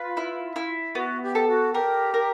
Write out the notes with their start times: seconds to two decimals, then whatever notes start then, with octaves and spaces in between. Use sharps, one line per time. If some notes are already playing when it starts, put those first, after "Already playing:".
Already playing: F4 B4
0.17 E4
0.56 E4
0.95 B3 F#4
1.22 G4
1.35 A4
1.48 F#4
1.73 G4 A#4
2.14 A#4